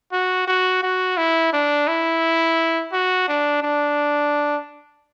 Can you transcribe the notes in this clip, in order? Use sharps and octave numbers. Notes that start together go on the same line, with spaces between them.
F#4
F#4
F#4
E4
D4
E4
F#4
D4
D4